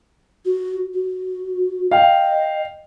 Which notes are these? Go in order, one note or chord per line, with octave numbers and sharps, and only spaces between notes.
F#4
F#4
D#5 F5 G5